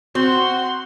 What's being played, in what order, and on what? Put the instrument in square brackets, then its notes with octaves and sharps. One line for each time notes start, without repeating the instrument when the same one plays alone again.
[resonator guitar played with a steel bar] C4 [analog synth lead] F#4 [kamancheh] C6